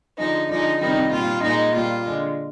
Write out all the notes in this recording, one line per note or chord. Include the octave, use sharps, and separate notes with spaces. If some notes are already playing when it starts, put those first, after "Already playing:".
D3 F3 G#3 D#4
D3 F3 G#3 D#4
C3 D#3 G3 D#4
A#2 G3 F4
A#2 G#3 D#4
A#2 G3 F4
D3 G#3